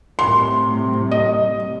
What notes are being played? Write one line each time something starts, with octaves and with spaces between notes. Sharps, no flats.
A2 C3 G3 C6
D#5